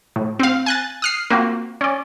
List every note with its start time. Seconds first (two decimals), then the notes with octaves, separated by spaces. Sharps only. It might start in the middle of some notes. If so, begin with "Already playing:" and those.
0.16 A2
0.39 C4 F5
0.66 G#5 F#6 A6
1.02 D#6 F6 C7
1.30 A#3 C4 F4 F#4
1.81 C#4 D5